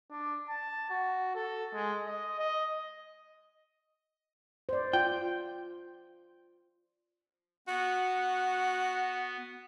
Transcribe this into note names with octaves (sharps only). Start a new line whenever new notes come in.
D4
A5
F#4
A4
G#3
D#5
D#5
C5 D5
F4 G5
B3 F#4